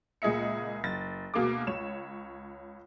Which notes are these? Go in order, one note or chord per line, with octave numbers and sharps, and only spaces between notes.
C#2 A#2 G#4 D#5 E5 C#7
F#1 A6
D2 B2 A#3 G#4 D6
C#2 C#5 E7